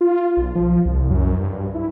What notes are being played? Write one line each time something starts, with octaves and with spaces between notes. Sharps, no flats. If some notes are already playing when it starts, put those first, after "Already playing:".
F4
B1
F3
C2
F#2
G2
E4